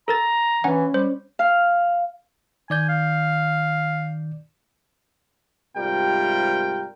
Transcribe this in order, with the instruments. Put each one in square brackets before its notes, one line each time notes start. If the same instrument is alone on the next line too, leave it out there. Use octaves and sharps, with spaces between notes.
[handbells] A4 A#4 A6 [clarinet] A#5
[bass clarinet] E3 [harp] C#4 [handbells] F#5 G#5
[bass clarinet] G3 [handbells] C5
[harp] F5
[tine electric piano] D#3 D5 G6 [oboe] G#5
[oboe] F5
[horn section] G#2 C3 G3 F4 A#4 G5